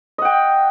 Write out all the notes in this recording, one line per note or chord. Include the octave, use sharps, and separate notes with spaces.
D#5 F#5 G5